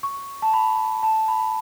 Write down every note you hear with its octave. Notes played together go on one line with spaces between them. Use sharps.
C#6
A5
B5
A5
B5